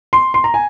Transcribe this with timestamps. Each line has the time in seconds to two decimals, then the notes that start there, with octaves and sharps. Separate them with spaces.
0.13 C6
0.34 C6
0.44 A#5
0.54 G#5